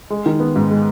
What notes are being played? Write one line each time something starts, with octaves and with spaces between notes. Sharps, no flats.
G#3
D#3
B3
G#2
G#3